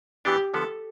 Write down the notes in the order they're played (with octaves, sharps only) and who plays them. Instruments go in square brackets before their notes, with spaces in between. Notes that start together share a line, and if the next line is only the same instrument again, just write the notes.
[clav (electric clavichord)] E3 B3 D4 [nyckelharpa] G4
[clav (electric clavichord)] D3 F3 B3 [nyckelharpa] A4